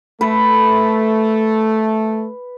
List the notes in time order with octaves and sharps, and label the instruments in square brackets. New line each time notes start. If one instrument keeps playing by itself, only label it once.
[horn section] A3 [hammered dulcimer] B4